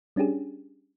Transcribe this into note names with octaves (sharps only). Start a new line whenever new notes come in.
G3 C#4 D4 G4 G#4